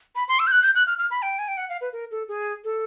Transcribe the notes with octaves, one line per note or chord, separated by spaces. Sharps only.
B5
C6
E6
G6
F#6
G6
F#6
F6
F6
B5
G5
G#5
G5
F#5
F5
B4
A#4
A4
G#4
A4